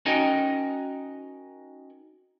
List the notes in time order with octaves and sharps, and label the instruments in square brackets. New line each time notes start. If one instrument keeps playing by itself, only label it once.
[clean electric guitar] C#4 D#4 F#4 A#4 D#5 G5